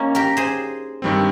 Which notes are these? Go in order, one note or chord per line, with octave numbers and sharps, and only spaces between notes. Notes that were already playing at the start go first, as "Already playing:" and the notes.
Already playing: A#3 C#4 D#4
G4 A#4
G#4 C5
G2 D#3 G3 C4